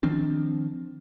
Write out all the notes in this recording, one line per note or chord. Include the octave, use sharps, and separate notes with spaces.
D#3 F3 C4 D4